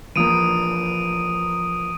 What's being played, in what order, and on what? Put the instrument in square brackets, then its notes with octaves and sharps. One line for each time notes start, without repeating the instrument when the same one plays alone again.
[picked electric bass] E3 F3 A#3 [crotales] D#6 D7 D#7